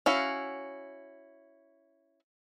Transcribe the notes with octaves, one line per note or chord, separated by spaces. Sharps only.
C#4 E4 F#4 F5